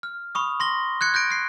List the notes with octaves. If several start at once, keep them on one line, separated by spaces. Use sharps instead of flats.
F6
B5 C#6 D#6
C6 A#6 G7
F#6 G#6 C#7
F#6 G6 A#6 D7
F#6 C7